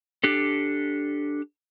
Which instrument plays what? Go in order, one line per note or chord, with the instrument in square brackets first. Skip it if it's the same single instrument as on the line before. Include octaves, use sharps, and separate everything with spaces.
[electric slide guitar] D4 G4 A4